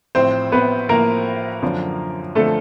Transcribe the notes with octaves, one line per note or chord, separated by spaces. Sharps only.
A1 A2 F3 C4 C5
B3 B4
A1 A2 F3 A#3 A#4
F#2 D3 F3
D3 F3 A3 A4